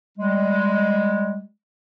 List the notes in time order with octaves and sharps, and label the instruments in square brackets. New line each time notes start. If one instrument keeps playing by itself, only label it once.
[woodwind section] G3 G#3